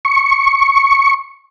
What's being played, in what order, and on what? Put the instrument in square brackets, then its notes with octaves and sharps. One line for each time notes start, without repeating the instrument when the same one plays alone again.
[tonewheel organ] C#6